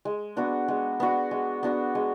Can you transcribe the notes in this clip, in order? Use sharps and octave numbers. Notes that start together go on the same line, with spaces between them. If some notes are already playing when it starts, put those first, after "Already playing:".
G#3
B3 D4 F#4
G#3
B3 D4 F#4
G#3
B3 D4 F#4
G#3